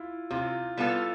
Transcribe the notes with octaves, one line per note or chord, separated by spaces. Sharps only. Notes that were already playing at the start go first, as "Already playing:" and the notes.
Already playing: E4 F4
C3 F4
G3 B3 F4 A4